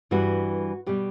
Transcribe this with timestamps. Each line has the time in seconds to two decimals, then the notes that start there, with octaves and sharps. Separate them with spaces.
0.11 G2 E3 G3 F#4
0.86 B2 G3 G4